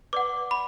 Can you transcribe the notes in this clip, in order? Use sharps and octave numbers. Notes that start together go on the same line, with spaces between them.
B4 D5 F#5 D6
B5